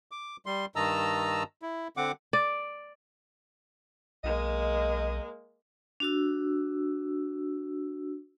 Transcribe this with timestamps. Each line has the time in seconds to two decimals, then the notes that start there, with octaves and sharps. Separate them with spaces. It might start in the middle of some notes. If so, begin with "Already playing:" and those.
0.11 D6
0.46 G3 C6
0.76 G2 D#3 D#5 A5 A#5 E6
1.62 E4
1.97 D3 C4 F#5 D6
2.33 D5
4.24 B1 G#3 A#3 D#5
6.00 D4 F#4 E6